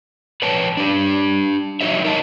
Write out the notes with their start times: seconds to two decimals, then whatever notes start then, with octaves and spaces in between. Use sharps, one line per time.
0.42 B4 C#5 G5 A5
0.77 D4 G4
1.81 F#3 D#4 F#4 C#5 E5
2.04 A#4 C#5 D#5 G#5 A5